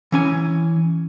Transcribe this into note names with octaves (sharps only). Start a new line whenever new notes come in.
E3 C#4 G#5